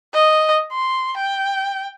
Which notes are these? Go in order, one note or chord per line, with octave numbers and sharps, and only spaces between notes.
D#5
C6
G5